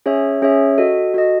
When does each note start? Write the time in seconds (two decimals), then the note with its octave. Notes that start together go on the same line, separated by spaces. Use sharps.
0.06 C#4 G#4 C#5 E5
0.42 C#4 G#4 C#5 E5
0.78 F#4 A4 D#5
1.14 F#4 A4 D#5